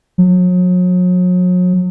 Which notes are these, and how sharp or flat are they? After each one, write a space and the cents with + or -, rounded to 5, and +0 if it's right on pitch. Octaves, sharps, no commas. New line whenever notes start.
F#3 -40